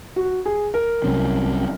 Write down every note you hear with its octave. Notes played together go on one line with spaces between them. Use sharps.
F#4
G#4
A#4
C2 C3 F#3 C#4